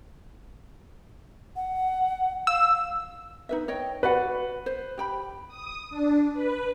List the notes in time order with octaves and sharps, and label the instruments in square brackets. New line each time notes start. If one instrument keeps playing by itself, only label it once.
[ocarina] F#5
[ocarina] F5 [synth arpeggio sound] E6
[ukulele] D#4 B4 E5
C#5 D#5 G5
[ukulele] F#4 D5 F#5 [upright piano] B4
[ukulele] C5
G4 G5 B5
[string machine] D#6
D4
B4